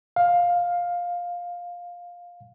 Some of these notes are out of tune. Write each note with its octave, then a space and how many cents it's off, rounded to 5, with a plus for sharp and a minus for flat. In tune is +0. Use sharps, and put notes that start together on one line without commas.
F5 +10